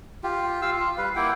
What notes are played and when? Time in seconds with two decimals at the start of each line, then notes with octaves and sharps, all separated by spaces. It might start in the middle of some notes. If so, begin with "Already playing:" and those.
0.24 F4 G4
0.62 F4 F5 E6
0.76 F4
0.98 G3 B4 F5
1.16 A#3 E4 F#5 G5